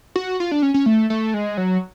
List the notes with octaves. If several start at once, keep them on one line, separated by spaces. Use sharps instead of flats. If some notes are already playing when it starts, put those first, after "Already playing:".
F#4
F4
D4
C#4
C#4
A3
A3
G#3
F#3